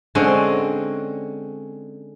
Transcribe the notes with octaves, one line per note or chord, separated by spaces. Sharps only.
D3 G#3 C4 C#4